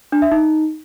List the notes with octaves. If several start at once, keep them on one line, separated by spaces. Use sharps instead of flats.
D4
E5
D#4